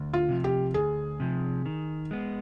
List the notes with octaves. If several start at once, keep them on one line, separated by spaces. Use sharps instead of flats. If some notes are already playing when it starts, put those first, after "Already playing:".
Already playing: D2
F4
C3 F3
G4
D2 G#4
C3 F3
D#3
G#3 B3